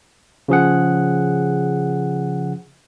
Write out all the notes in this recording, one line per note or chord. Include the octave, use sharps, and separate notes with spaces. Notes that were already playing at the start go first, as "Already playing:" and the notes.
C#3 F3 G#4 F#5